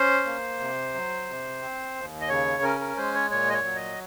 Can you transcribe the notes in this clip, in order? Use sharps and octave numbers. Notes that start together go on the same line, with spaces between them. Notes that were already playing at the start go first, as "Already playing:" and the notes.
Already playing: C#4 C5
A#3
C3
F#3
C3
C4
D#2
D#5
C#3 C#5
C#4 A#4
A#4
G#3 C5
C#5
A#2 C#5
D#5
C#5
F#3
D#5